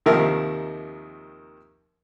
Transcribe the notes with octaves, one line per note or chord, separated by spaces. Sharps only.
D#2 C3 D#3 F3 A#4 E5